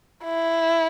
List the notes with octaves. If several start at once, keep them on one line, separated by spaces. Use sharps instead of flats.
E4